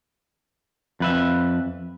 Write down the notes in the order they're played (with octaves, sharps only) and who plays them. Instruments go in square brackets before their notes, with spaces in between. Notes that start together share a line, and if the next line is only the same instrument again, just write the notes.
[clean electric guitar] F2 B4 E5